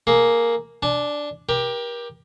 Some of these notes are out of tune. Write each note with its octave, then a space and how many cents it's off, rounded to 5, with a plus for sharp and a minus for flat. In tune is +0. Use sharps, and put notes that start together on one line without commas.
A#3 +0 G#4 +20
D4 +0 G#5 +40
G4 +10 A#4 +35